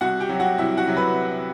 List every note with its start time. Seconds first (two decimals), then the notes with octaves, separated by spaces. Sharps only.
0.01 C2 F#4 F#5
0.20 G4 G5
0.29 C3 F#3
0.40 F#4 F#5
0.58 C2 E4 E5
0.77 F#4 F#5
0.87 C3 F#3
0.97 B4 B5